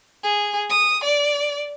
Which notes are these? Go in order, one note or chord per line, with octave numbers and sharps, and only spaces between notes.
G#4
D#6
D5